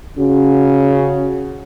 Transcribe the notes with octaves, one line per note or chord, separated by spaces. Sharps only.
C#3 C#4 F#4